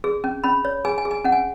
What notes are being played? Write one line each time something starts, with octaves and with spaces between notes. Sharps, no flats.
G#4
C#4
C#4 B5
C#5
G#4 G#5
G#5
G#4
G#5
C#4 F#5
G#5